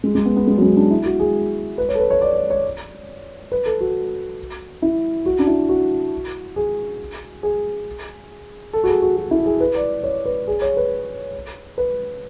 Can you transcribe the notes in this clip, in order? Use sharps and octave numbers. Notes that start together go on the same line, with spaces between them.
G#3
G#3
B3
B3
G#3
F#3
G#3
D4
E4
F#4
G#4
B4
C#5
A4
B4
C#5
D5
C#5
C#5
B4
A4
F#4
E4
F#4
D4
E4
F#4
G#4
G#4
A4
F#4
G#4
F#4
F#4
E4
G#4
B4
D5
C#5
B4
G#4
C#5
B4
B4